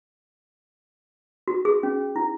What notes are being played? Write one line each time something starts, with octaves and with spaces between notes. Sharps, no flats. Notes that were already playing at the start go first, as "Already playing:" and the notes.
F#4
G#4
C#4
E4